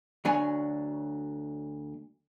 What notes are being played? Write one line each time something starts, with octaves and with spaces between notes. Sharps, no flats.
D2 F#3 D4 C#5 G#5